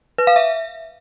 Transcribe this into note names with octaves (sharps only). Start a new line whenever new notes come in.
B4
F5
E5